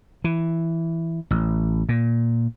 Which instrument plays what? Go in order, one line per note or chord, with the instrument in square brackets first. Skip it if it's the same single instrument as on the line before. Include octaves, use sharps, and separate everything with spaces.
[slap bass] E3
A1
A#2